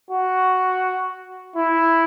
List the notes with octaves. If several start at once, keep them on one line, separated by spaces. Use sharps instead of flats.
F#4
E4